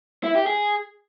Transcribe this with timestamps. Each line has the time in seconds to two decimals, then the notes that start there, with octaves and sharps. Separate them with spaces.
0.24 E4
0.35 G4
0.47 G#4